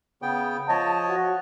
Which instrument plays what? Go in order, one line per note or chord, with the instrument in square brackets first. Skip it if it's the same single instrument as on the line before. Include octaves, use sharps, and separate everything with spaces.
[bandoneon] C#3 B3 G5
[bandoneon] F3 C#5 D#5 [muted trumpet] A5
[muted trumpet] F#4